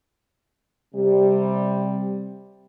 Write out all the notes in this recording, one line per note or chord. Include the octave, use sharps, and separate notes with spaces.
C3 G3